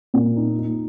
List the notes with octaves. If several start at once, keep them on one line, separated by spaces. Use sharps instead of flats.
A#2
D#4
D#4